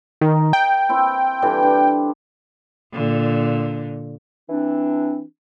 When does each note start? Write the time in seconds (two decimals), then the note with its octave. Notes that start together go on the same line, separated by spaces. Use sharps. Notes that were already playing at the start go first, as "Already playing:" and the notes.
0.21 D#3 A#4 D#5
0.53 G5
0.89 C4 E4
1.42 D3 E3 G3
1.63 D4 G4
2.93 A#2 D3
4.50 E3 C4 D4